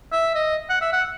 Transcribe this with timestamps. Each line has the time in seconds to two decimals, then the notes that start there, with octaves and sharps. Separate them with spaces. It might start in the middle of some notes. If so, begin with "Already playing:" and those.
0.12 E5
0.35 D#5
0.70 F#5
0.81 E5
0.93 F#5